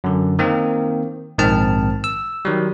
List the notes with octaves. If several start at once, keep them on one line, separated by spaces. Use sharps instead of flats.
F#2 D3
D#3 A#3 C4
A#1 G#2 D#3 C4 A5 F6
E6
D#3 F#3 G3